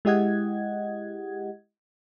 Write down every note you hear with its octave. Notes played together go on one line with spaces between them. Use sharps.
G#3 E4 G4 D#5 F#5 G#6